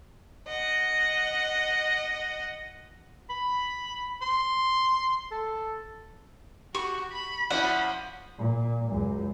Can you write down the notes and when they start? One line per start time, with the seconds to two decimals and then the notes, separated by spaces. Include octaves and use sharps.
0.47 D#5 F#5
3.30 B5
4.22 C6
5.31 A4
6.75 F#4 G4 C#6
7.12 B5
7.50 F3 A#3 C#4 E4 F#4 D5 F#5 B5
8.39 A#2
8.91 C#2 F#2